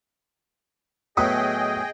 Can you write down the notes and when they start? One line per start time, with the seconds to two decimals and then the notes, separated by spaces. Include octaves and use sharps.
1.17 A2 F#3 B3 G#4 D#5 G5 D#6